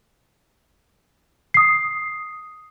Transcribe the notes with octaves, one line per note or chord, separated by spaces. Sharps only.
D#6 C7